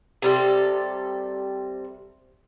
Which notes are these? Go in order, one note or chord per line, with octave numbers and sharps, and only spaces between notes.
C3 G3 A4